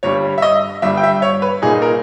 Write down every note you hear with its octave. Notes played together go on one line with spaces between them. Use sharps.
G1 G2 G3 C#5
E5
D#5
G1 G2 G3 E5
G5
E5
C#5
B4
A#2 A#3 D#4 G#4
A#4